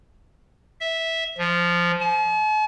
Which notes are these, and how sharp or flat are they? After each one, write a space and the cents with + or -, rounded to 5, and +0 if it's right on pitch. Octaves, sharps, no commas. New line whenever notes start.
E5 -10
F3 -5
A5 -45